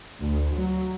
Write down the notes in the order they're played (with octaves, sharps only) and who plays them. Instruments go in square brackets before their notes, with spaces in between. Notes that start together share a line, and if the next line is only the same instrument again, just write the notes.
[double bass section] D2
F#3